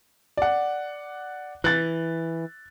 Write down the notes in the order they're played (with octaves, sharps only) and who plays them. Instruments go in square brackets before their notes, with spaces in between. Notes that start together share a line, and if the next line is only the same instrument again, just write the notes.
[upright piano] D5 F#5
[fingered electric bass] E3 [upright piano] F#6 A6